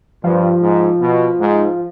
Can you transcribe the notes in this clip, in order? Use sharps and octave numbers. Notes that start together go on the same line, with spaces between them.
G2 F3
G#2
B2
G#2